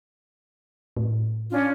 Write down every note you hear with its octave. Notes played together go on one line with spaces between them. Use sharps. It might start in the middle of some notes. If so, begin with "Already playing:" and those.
A2
C#4 D4 F4